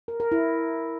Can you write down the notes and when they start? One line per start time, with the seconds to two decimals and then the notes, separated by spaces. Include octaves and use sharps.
0.08 A#4
0.20 A#4
0.32 E4